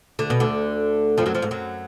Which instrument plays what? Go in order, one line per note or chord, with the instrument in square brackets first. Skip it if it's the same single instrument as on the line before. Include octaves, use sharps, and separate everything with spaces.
[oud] D2 D3
B2
D2 D3
F2 F3
F#2 F#3
F2 F3
G#2
F#2 F#3